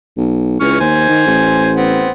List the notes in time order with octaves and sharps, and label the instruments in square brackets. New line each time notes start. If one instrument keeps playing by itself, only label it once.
[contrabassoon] B1
[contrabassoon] C#2 [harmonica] E3 C#6 F6
[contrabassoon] D#2 [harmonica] C5 G#5
[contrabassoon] D#3
A1
[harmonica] B3 C4